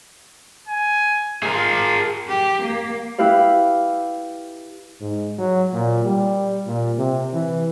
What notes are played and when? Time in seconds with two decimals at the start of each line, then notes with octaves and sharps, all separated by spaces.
0.68 G#5
1.43 F4 G#4 A#4
2.28 G4
2.63 A#3
3.18 E4 G4 B4 F5
5.01 G#2
5.38 F#3
5.73 A#2
6.06 G3
6.67 A#2
6.98 C3
7.33 E3